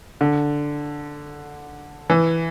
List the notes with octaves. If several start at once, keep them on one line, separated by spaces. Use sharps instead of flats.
D3
E3